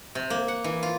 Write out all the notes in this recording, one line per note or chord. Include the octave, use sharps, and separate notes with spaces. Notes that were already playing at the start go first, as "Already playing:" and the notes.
C3
A#3
F#5
E3
F4